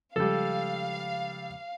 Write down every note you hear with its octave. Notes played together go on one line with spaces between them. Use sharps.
C#3 F3 G3 G#3 A4 F5